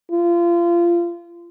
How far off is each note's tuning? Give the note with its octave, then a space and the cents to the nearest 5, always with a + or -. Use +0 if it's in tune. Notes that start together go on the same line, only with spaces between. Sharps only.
F4 -25